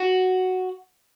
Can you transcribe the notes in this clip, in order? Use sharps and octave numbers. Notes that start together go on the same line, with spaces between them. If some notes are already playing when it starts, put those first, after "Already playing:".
Already playing: F#4